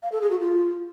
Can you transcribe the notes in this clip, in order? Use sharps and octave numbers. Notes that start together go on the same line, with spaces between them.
F5
A4
G#4
F#4
F4